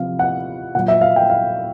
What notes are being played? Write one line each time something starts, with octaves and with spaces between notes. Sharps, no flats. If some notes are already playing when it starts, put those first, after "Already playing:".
Already playing: C3 F3 F5
F#5
A#2 F#3 F#5
E5
F5
G5
F5